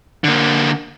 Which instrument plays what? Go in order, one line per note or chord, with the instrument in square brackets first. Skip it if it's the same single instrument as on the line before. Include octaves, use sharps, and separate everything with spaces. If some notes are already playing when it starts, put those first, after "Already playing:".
[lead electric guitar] D3 A#3